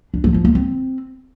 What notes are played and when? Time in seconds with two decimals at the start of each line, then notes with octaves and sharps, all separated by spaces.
0.14 D4
0.24 F#3
0.34 F3
0.45 A#3
0.55 C4